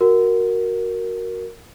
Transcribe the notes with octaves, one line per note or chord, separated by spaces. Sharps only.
F#4 A#4